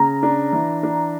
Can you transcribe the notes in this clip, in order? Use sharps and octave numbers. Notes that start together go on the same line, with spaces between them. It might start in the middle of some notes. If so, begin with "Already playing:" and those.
Already playing: C#3 A#5
D4
E3
D4